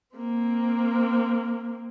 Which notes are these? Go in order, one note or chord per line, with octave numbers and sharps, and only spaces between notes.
A#3 C4